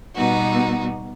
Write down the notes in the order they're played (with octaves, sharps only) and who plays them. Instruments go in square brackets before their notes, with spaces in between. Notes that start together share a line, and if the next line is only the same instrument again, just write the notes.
[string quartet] B2 G3 B3 D#4 F#4